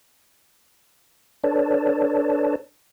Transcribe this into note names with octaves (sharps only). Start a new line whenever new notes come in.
D4 A4 B4 C#5 D5 A5